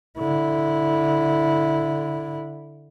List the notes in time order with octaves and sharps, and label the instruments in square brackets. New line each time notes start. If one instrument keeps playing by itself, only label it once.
[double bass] D3 E4